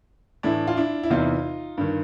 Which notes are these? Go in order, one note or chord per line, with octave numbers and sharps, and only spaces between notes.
A2 E3 D4 E4
F4
D4 E4
E4
E2 C3 E3 D#4 F4
G2 D#3